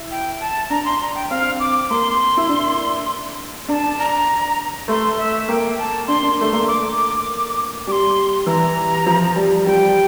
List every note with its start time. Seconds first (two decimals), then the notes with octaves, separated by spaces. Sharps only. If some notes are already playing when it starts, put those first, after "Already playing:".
Already playing: E4
0.11 G5
0.40 A5
0.70 D4 A#5
0.85 C6
1.01 A#5
1.15 G5
1.30 C4 F5
1.60 D6
1.90 A#3 C6
2.37 E4
2.49 D4
3.69 D4 A#5
3.72 A5
3.99 A#5
4.88 A3 C6
5.18 E5
5.48 A#3 G5
5.79 A5
6.07 D4 C6
6.23 D4
6.38 A3 C6
6.53 A#3
6.67 D6
6.98 D6
7.87 G3 D6
7.92 C6
8.46 E3 A#5
9.06 F3
9.36 G3
9.66 G3 G5